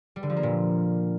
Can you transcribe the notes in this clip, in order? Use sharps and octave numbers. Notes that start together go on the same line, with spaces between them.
G3
D3
F3
A#3
A#2